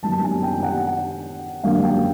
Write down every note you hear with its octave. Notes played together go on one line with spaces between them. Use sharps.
G1 F#2 D#3 G3 B3 A5
A5
G#5
G5
F#5
G#1 F#2 D3 G3 A#3 F5
G5